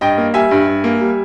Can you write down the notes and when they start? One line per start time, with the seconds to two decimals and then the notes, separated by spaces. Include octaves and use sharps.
0.01 G2 D#5 G5
0.18 A#3
0.34 G3 E5 G#5
0.51 G2
0.67 G2
0.84 A#3
1.01 G3